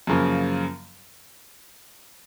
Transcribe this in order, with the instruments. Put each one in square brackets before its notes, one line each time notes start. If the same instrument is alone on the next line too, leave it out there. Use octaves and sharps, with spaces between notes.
[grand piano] F#2 C#3 F3 A#3